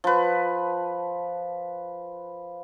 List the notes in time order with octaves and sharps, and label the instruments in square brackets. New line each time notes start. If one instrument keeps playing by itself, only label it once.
[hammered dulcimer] F3 B4